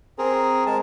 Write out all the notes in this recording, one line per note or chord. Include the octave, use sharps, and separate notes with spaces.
C4 G#4 A#4
G#3 A5